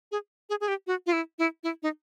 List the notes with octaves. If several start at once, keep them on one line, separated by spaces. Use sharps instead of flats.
G#4
G#4
G#4
G4
F#4
F4
E4
E4
E4
D#4